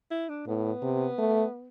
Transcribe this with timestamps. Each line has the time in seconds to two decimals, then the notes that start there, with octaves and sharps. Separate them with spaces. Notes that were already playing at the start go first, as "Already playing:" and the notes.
0.11 E4
0.29 D4
0.47 A2 B3
0.83 C3
1.19 A3